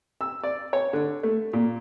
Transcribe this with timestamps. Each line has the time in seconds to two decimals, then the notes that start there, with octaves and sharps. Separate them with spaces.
0.21 E6
0.44 D5
0.73 C#5
0.93 D3
1.23 A3
1.53 A#2